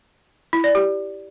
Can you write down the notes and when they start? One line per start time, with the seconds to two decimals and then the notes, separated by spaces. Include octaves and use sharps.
0.53 E4
0.64 D5
0.75 G4